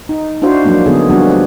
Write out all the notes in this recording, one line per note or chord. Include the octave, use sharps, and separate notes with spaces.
D#4
D4 E4 F#4 C5 F5
F3 F#3 G#3 A#3 D4
D3 F3 B3 C#4 D#4 G#4
F3 G3 A#3 D4 F#4 B4